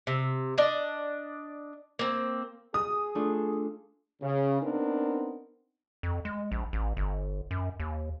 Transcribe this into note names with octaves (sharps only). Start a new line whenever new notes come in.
C3
D4 D5 D#5
A#3 C4
G#4 D#6
A3 D4 F4
C#3
B3 C4 D4 D#4 A#4
F2
G#3
A#1
A1
G1
F#2
D#2